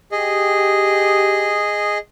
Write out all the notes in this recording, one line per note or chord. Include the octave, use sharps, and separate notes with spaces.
G4 G#4 D#5